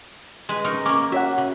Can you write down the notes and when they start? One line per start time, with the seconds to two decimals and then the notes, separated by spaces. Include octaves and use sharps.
0.49 G#3 B4
0.64 C#4 D#4 A#4
0.86 A#3 C#4 D6
1.12 F#4 C#5 E5 F#5
1.38 C#3